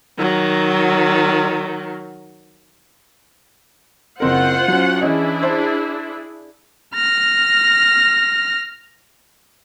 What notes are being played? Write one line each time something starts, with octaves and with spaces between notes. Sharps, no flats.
D#3 F#3
F#1 C4 F4 A#4 C5 F#5
F#3 C#4
E3 C#4 D4 E4 G#4 D#5
C5 A5
F6 A#6